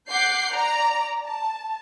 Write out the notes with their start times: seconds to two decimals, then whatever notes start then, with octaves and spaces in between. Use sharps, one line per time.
0.11 F#5 D6 G6 C7
0.51 D5 A#5
1.25 A5